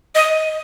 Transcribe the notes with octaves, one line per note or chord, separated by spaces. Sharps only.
D#5